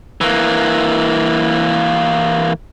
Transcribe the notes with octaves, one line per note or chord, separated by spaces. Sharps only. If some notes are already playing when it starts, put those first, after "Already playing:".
E3 A#3